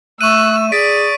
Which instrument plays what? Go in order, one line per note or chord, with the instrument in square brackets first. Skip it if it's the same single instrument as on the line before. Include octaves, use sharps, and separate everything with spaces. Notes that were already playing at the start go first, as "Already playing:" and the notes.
[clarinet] A3 [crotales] C#6 D#7 [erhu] E6 [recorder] F#6
[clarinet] G#4 [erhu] D5 [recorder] A6 [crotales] B6 D7